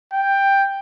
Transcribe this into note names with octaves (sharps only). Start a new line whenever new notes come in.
G5